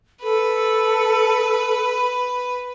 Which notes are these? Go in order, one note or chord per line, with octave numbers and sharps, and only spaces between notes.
A4 B4